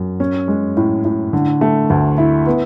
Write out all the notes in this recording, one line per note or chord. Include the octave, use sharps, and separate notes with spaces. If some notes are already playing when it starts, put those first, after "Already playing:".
Already playing: F#2
C#4
G#3
A2
A2
D3
A3
D2
E4
B3